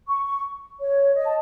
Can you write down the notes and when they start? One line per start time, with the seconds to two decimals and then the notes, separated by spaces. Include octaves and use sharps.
0.08 C#6
0.26 C#6
0.80 C#5
1.16 D#5
1.26 A5